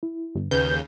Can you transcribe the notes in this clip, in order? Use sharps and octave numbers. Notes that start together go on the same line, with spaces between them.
E4
G1
D#2 C#3 B4 G6